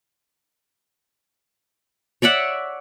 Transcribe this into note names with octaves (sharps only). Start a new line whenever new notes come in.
C#5 D5 E5 F#5